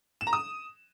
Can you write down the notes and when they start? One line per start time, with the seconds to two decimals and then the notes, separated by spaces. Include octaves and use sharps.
0.21 E7
0.27 A#5
0.33 D#6